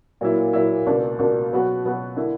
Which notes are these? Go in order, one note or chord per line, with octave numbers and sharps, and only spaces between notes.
A#2 F#3 A#3 E4
A#2 F#3 A#3 E4
C#2 B2 A#3 D4
C#2 B2 A#3 D4
B2 F#3 B3 F#4
B2 F#3 B3 F#4
D3 A#3 E4